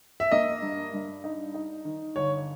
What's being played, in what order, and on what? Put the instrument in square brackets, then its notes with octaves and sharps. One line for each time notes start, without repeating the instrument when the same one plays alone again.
[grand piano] E5
[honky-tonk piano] A#3 [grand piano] D#5
[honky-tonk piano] G2
G2
D#4
D#4
D#3
[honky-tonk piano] G1 [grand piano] C#5